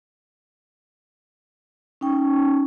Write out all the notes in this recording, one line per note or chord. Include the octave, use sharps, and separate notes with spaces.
C#4 D#4 G5 C#6